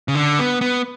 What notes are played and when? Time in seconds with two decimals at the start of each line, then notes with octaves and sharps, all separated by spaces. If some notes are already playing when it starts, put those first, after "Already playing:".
0.08 C#3
0.15 D3
0.39 B3
0.61 B3